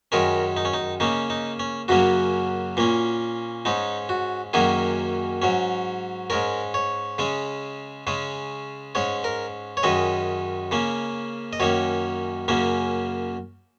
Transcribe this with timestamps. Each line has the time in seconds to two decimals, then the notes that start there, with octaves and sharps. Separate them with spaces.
0.12 F#2 D#3 G#3 C#4 A#4
0.57 D#4
0.65 C#4
0.74 D#4
1.00 C#3 A#3 C#4 D#4
1.30 D#4
1.59 C#4
1.88 F#2 C#3 F#3 A#3 C#4 F#4
2.77 A#2 A#3 C#4
3.65 G#2 G#3 C#4 D#4
4.09 F#4
4.53 F#2 D#3 F#3 A#3 C#4 G#4
5.42 G#2 F#3 C#4
6.30 G#2 G#3 C#4 A#4
6.74 C#5
7.18 C#3 G#3 C#4
8.07 C#3 G#3 C#4
8.95 G#2 G#3 C#4 C#5
9.24 A#4
9.77 C#5
9.83 F#2 D#3 G#3 C#4 D#5
10.71 C#3 A#3 C#4
11.53 D#5
11.60 F#2 D#3 A#3 C#4 C#5
12.48 F#2 C#3 A#3 C#4